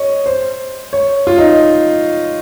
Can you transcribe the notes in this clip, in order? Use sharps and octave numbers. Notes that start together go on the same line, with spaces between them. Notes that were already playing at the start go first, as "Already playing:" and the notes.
Already playing: C#5 D#5
C5
C#5
F4
D#4